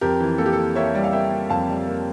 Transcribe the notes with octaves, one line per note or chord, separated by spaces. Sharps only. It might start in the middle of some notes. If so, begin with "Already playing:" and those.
F2 G4 A#4
E3
A#3 A4
G4
A#3 A4
A#3 C#5 E5
G3
F5
A#3 E5 G5
A#3
F2 F5 A5
G3
A#3